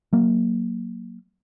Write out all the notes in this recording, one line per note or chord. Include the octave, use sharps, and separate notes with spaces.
F#3 A#3